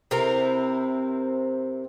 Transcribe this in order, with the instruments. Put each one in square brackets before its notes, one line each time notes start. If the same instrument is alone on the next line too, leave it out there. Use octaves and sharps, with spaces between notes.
[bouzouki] C3 C4 E4 A#4